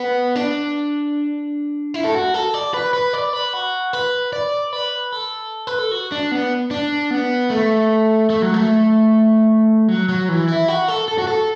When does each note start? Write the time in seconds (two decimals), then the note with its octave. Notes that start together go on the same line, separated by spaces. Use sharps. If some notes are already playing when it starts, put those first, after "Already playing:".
Already playing: B3
0.36 D4
1.94 E4
2.04 A4
2.15 F#4
2.34 A4
2.54 D5
2.74 B4
2.94 B4
3.13 D5
3.33 B4
3.53 F#4
3.93 B4
4.33 D5
4.73 B4
5.12 A4
5.67 B4
5.79 A4
5.91 F#4
6.12 D4
6.32 B3
6.71 D4
7.11 B3
7.50 A3
8.30 A3
8.42 F#3
8.54 A3
9.88 F#3
10.09 F#3
10.29 E3
10.49 E4
10.68 F#4
10.88 A4
11.08 A4
11.18 F#4
11.27 A4